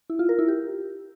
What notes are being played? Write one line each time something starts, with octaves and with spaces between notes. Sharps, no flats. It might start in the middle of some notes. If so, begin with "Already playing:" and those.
E4
F4
A#4
E4
G4